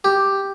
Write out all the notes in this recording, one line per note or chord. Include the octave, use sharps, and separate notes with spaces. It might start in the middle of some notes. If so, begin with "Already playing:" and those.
G4